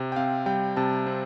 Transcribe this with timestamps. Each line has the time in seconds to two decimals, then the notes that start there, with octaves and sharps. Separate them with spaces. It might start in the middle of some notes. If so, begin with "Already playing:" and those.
Already playing: C3
0.12 G5
0.16 C4 F5
0.46 G3 G5
0.77 C3 A5
1.06 C4